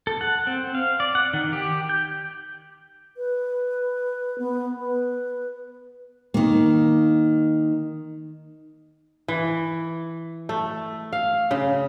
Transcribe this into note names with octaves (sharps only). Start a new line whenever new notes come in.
A4
F#5
C4
F5
D5
F#5
D#3
G4
G6
B4
B3
B4
D#3 A#3
E3
A3
F5
C#3